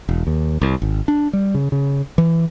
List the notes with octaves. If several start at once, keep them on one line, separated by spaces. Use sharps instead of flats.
E1
D#2
C2
G#1
D4
G3
C#3
C#3
E3